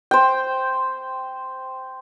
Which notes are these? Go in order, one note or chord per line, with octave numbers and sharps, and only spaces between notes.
C5 G5